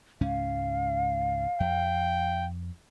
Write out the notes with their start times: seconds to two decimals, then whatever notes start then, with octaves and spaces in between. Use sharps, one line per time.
0.21 C#2 G#2 C#4 F5
1.60 F2 G5